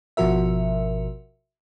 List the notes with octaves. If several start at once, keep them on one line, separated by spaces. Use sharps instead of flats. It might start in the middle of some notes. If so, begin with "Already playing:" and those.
G#1 B2 F3 F#4 A#4 E5